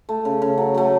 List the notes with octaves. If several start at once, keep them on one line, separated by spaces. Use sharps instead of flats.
A3
C#3
C#3
F#3
F#3 A3